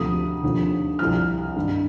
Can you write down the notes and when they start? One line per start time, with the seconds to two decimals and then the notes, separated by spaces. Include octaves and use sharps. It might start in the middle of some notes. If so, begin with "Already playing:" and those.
Already playing: D2 C3 F3 D#6
0.43 D#2 D3 F3
0.99 C2 C3 F3 F6
1.56 G2 D#3